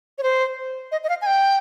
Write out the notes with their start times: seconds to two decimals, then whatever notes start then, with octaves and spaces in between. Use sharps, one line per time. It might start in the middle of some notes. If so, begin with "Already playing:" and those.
0.18 C#5
0.23 C5
0.92 D#5
1.04 D#5
1.09 F5
1.22 G#5
1.26 G5